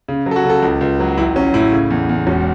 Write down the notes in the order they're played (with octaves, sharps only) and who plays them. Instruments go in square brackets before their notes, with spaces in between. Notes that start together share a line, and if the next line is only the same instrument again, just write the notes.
[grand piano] C#3
F#3
A4
F#4
C#3 A4
C#2
C#2
F#3
A1 E4
F#3 C#4
A2 E4
C#3
E2
E2
E1 C#4